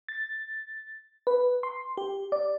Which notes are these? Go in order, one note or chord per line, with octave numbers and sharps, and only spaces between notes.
A6
B4
C6
G4
D5